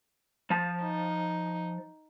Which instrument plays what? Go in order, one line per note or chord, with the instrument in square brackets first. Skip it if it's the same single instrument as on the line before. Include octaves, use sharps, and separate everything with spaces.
[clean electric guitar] F3 A5
[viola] D#4